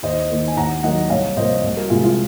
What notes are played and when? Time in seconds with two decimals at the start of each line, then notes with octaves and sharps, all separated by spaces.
0.03 D#2 C5 D#5
0.30 D#3 A#3
0.48 G#5
0.56 D#2 F#5 A#5
0.83 D#3 F#3 A#3 D#5 F#5
1.10 C2 C#5 F5
1.37 C3 F3 A#3 C5 D#5
1.64 C2
1.77 F#4 A#4
1.90 C3 F3 G#3 F4 G#4
2.04 F4